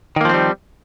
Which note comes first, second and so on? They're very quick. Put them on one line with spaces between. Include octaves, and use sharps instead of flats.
D#3 A#3 F3 C4 G3